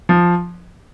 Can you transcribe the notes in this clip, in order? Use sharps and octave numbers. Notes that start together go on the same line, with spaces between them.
F3